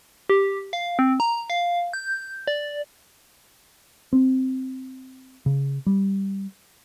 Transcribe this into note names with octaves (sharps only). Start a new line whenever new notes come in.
G4
F5
C4
A#5
F5
G6
D5
C4
C#3
G3